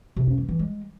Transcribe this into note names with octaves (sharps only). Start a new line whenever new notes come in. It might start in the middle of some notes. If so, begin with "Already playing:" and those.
C3
C#4
E3
E3
G#3